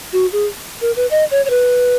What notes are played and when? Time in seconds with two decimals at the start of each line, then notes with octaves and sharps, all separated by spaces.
0.12 F#4
0.32 G#4
0.81 A#4
0.96 B4
1.11 D#5
1.31 C#5
1.45 C#5
1.50 B4